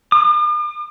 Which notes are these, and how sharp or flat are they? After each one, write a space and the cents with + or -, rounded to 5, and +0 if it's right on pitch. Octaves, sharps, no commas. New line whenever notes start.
D6 +45